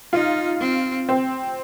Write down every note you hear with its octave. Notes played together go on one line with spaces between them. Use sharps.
D#4 F4
C4
C4